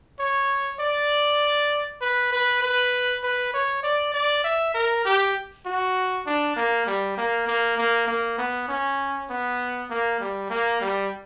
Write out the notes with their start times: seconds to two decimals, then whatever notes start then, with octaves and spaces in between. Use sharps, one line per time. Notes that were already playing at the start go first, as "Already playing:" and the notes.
0.19 C#5
0.80 D5
2.01 B4
2.32 B4
2.62 B4
3.24 B4
3.53 C#5
3.83 D5
4.14 D5
4.44 E5
4.74 A#4
5.05 G4
5.66 F#4
6.26 D4
6.56 A#3
6.86 G3
7.17 A#3
7.47 A#3
7.78 A#3
8.08 A#3
8.38 B3
8.68 C#4
9.29 B3
9.90 A#3
10.20 G3
10.50 A#3
10.81 G3